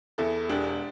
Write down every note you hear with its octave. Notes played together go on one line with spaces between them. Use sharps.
E2 E4 A4
E1 D4 G4